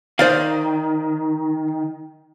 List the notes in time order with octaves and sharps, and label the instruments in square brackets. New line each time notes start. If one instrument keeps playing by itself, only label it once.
[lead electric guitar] D#3 [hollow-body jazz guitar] C5 D5 F5